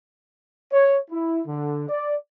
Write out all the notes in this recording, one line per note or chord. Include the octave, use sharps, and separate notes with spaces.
C#5
E4
D3
D5